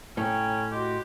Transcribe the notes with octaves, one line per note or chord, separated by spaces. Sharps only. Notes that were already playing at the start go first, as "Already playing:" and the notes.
A2 A3 C#4 G5 A#5
F#4 G4 D#5 C6